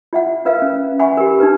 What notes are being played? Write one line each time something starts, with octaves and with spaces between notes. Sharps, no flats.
F4 E5 F#5
F4 A#4 B4 E5 F5
C#4
E5 F#5 G#5 B5 C#6
G4 A#4
D4 D#4 B4